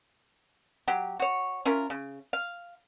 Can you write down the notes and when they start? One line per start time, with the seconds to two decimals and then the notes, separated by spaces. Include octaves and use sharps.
0.88 F#3 G4
1.19 F#4 C#5
1.65 C#4 E4 F4 A#4
1.90 C#3
2.33 F5